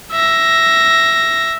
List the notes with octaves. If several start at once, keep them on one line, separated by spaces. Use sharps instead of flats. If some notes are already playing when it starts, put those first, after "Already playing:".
E5 A#6